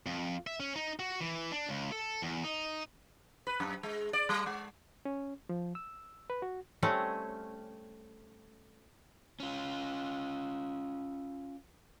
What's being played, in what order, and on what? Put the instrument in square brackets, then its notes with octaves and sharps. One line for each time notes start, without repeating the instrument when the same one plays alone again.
[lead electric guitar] F2
E5
C#4
D#4
F#4
E3
D4
C#2
A4
E2
D#4
[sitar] B4
F#2
G#3
D5
G3
G#3
[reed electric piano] C#4
F3
E6
B4
F#4
[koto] G3 A3 C4 C#4
[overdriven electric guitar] C#4 F4